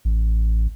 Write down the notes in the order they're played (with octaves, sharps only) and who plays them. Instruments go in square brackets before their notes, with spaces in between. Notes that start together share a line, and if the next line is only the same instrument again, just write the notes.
[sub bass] A1